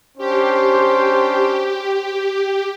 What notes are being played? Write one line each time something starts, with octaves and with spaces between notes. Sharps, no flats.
C#4 D4 G4 C5